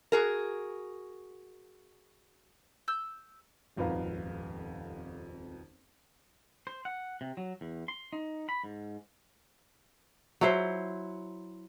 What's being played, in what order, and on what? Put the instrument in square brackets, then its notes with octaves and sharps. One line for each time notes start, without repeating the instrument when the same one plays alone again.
[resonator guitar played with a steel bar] F#4 G#4 A#4
[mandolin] E6 G6
[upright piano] D#1 G#1 F2 B4 F5 A#5
[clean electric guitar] C5
F#5
C3
F#3
E2
C6
D#4
B5
G#2
[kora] F#3 E4 C5